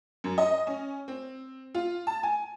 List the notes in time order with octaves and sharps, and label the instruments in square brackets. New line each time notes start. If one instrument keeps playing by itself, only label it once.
[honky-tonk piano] F#2
D#5
C#4
C4
F4
A5
G#5